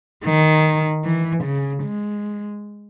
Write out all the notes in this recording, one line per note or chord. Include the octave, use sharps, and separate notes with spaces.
D#3
E3
C#3
G#3